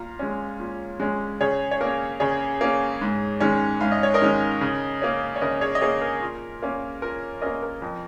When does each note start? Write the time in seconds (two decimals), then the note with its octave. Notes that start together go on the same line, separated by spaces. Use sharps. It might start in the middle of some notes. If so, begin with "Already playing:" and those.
Already playing: A#2 F5 A#5
0.19 G#3 C#4
0.60 A#2
1.00 G#3 C#4
1.41 C#3 G#4 C#5
1.71 C#5
1.81 A#3 C#4 A#4
2.20 C#3 G#4 C#5
2.61 A#3 C#4
3.01 G#2
3.40 D#3 G#3 C#4
3.80 G#2 F5
3.92 D#5
4.03 C#5
4.14 A#4 D#5
4.22 D#3 G#3 C#4
4.61 C#3
5.02 A#3 C#4
5.36 C#5
5.41 C#3 A#4 D#5
5.61 G#4 C#5
5.75 D#5
5.81 A#3 C#4 G#4 C#5
6.01 A#4
6.22 A#2
6.62 A#3 C#4
7.02 A#2 A#4
7.42 A#3 C#4 A#4 D#5
7.63 A#4
7.82 F2